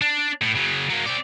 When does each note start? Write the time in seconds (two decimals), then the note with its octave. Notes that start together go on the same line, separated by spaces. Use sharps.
0.01 D4
0.41 A2
0.55 C#3 F#3
0.89 F#3 A#3
1.06 C4 D5